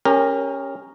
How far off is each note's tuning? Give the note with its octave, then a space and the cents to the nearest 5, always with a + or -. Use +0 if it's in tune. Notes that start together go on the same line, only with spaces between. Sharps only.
C#4 +0 G4 +30 A#4 -5